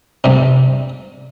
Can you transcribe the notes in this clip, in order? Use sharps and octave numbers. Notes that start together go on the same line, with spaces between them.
G2 C3